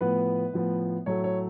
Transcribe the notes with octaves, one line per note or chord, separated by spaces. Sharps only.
A2 F3 B3 B4
A2 F3 B3
A2 F#3 A3 C#5
C#5